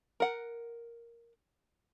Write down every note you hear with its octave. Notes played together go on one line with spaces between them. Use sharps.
A#4 F#5